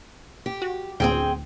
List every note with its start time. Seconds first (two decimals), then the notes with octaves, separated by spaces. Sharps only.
0.46 G4
0.62 F#4
1.00 D2 A2 C4 G#4 G5